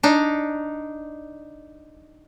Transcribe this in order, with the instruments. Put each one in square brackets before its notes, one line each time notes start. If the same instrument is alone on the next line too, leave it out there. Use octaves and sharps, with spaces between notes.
[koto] D4 D#4